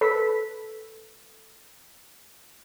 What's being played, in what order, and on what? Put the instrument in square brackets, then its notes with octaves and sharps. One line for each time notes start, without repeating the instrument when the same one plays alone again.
[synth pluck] A4 B4 B6